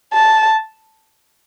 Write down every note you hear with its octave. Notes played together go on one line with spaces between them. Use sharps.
A5